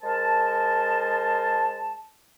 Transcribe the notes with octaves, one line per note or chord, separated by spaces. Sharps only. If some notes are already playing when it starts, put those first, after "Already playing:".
G#3 A#4 C5 A5